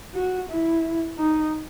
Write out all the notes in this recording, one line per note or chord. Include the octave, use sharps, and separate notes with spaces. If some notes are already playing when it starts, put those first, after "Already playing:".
F#4
E4
D#4